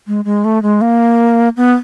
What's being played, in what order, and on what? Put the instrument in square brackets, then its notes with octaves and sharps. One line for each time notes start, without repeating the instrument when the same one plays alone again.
[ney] G#3
G#3
A3
G#3
A#3
B3